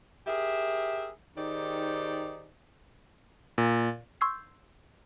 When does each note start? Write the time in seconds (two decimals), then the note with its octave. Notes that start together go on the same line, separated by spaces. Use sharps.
0.27 G4 G#4 A#4 E5
1.36 D#3 D#4 G4 G#4 C5 D5
3.58 A#2
4.21 C6 C#6 E6 G6 G#6 C7